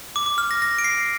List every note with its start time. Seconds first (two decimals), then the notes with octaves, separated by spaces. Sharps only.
0.16 D6
0.26 D6
0.38 F6
0.51 A#6
0.62 A#6
0.78 D7
0.84 C7